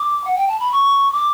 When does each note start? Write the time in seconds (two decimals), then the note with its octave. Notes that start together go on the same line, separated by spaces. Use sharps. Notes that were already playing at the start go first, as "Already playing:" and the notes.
Already playing: D6
0.24 F#5
0.36 G5
0.48 A5
0.60 B5
0.72 C#6
1.13 D6